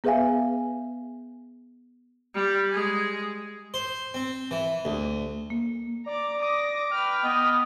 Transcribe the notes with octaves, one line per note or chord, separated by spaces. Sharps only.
B3 G#4 B4 E5 F5 G#5
G3 G4
G#3 G#4
C5
C4
E3
D2
A#3
D5 A#5 D6
D6 D#6 A#6
B4 G5 F6
B3 D#5